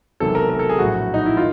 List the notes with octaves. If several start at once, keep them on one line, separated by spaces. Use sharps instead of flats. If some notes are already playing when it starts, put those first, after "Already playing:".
E1 E2 C3 D#3 F#3 A4
A#4
A#4
A4
G#4
A#1 A2 F#3 F#4
D#4
E4
D#3 F4